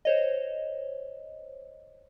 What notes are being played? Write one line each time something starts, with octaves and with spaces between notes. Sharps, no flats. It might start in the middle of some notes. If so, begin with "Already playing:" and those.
C5 C#5 D#5